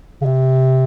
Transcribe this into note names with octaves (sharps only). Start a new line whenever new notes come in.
C#3
C3